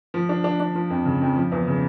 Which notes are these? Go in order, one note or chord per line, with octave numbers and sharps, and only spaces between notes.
F3
D4
D4
D4
F3
F2
C#3
F2
F3
E2
C#3